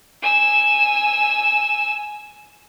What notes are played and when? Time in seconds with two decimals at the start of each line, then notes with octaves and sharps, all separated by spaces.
0.22 G#5 E6